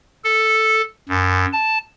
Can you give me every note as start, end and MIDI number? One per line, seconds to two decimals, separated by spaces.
0.24 0.82 69
1.09 1.46 42
1.53 1.78 81